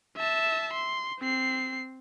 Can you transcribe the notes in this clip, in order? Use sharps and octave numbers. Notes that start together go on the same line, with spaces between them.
E5 A5
C6
C4 C7